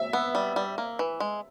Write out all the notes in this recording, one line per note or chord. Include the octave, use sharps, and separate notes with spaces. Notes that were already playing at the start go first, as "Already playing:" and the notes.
Already playing: E5
B3
G3
G3
A#3
E3
G#3